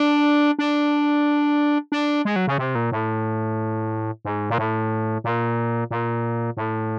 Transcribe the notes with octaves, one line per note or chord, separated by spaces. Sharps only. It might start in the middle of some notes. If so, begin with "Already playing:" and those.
Already playing: D4
D4
D4
G#3
F#3
C#3
C3
A#2
A2
G#2
A#2
A2
A#2
A#2
A2